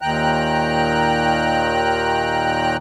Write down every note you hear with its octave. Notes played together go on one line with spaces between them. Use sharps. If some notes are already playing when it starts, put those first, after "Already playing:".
D#2 A#2 D#3 G5 A#5 F#6